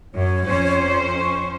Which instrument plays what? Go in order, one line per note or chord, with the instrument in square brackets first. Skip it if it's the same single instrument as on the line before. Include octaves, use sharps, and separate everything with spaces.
[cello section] F#2 [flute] C#5
[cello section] F2 C#4 C5
[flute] C#6